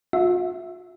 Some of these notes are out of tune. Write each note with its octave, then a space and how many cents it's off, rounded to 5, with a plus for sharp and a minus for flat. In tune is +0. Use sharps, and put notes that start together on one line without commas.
F4 +45 E5 +0